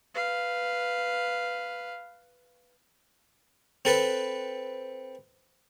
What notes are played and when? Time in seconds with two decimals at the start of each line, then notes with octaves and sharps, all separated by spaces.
0.15 B4 F5
3.85 C4 A4 B4